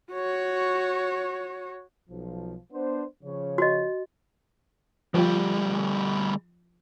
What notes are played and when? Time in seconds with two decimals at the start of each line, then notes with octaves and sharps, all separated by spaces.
0.12 F#4 C#5
2.10 B1 F3
2.72 B3 D4 C5
3.23 C#3 F3 C#5
3.58 F#4 D#5
5.14 D2 F3 G3 F4